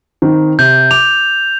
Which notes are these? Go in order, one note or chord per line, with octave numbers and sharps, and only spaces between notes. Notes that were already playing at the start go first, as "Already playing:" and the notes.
D#3 C4
C3 G6
D6 F7